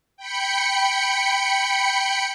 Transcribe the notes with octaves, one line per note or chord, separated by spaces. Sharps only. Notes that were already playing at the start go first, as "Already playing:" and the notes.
G5 B5 C#7